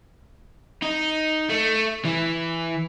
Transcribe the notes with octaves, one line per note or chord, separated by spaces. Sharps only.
D#4
A3
E3